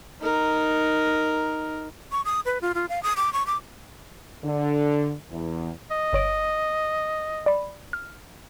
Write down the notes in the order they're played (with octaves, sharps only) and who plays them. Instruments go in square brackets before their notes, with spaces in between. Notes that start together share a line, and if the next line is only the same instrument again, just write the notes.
[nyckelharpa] D#4 A#4
[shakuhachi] C#6
D#6
B4
F4
F4
F5
D#6
D6
C#6
D6
[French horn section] D3
E2
[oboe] D#5
[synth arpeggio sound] G1 C#5 D7
D5 B5
F6